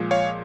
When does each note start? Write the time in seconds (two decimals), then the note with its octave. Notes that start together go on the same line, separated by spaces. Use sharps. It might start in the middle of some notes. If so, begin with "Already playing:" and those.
Already playing: A#2 F3 G#3
0.11 C#5 F5